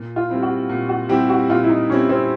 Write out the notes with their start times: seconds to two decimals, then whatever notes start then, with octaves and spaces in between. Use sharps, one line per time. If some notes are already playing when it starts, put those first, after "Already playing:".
Already playing: A#2
0.16 F4
0.29 G3 C4 E4
0.42 F#4
0.69 A#2
0.89 F#4
1.09 G3 C4 E4 G4
1.29 F#4
1.49 A#2 F4
1.64 E4
1.69 D#4
1.90 G3 C4 C#4 E4
2.09 C4